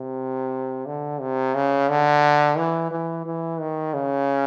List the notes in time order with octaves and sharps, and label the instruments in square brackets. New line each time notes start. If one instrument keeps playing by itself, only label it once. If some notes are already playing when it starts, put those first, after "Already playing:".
Already playing: [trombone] C3
D3
C3
C#3
D3
E3
E3
E3
D#3
C#3